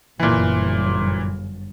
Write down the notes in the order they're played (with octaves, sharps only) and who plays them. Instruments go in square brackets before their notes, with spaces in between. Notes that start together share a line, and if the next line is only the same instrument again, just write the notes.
[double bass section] G1 F#2 [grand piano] A#2 E3